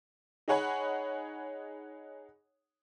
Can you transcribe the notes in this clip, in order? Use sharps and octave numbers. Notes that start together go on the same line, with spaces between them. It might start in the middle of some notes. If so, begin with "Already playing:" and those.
D#4 G#4 C#5 F#5 G#5 B5